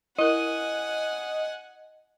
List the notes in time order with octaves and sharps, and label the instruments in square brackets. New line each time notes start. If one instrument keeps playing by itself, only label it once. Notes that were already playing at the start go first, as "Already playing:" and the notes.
[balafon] E4 A#4 [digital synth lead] D#5 [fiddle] F#5 G#5